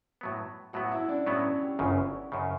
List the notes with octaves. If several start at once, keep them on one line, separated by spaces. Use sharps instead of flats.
A2 F#3 B3
A2 F#3 B3 F#4 F#5
E4 E5
D4 D5
A2 F#3 B3 C#4 C#5
G4
G1 F#2 C#3
F#2 C#3